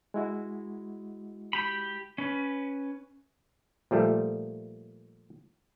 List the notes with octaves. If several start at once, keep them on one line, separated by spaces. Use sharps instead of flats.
G#3 E4 F#4
G4 B5
C#4 B4
A#2 F3 G3 A3